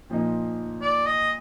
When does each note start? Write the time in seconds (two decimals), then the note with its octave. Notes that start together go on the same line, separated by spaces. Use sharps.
0.10 A#2 F3 A#3 D#4
0.81 D5
1.06 D#5